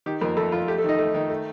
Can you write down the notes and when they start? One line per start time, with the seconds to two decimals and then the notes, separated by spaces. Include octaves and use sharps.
0.06 D#3 G4
0.21 F2 A#3 A#4
0.37 F2 A3 A4
0.52 F2 F4
0.68 A3 G4
0.78 A3 A4
0.84 D#3 D#4 D#5
0.99 A3
1.14 D#3
1.30 A3